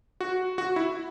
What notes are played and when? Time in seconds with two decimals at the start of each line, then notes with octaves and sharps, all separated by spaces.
0.21 F#4
0.58 F#4
0.76 E4